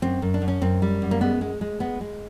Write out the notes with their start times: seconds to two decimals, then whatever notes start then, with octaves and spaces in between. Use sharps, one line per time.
0.02 F#2 C4
0.22 F#2
0.34 D4
0.42 F#2
0.48 C#4
0.61 F#2 C4
0.82 G3
1.02 F#2
1.11 A#3
1.21 G#3 B3
1.41 G#3
1.61 G#3
1.80 G#3 B3
2.01 G#3